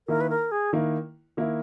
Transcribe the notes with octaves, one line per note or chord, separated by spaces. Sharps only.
D#3 A#3 E4 A#4
B4
A#4
G#4
D#3 A#3 E4
D#3 A#3 E4